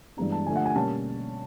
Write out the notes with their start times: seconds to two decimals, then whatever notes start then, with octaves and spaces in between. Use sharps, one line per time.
0.17 G2 E3 G#3 B3 D4 A#5
0.32 A5
0.46 D3 F3 A3 G#5
0.56 F#5
0.66 G#5
0.75 B2 G3 A#3 C#4 A5